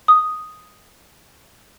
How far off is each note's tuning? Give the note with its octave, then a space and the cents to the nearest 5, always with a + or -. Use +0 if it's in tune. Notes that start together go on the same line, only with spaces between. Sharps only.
D#6 +0